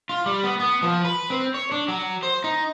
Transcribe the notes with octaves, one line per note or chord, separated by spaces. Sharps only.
F4
G3
B3
B3
F3
B4
C4
C#5
D4
F#3
C5
D#4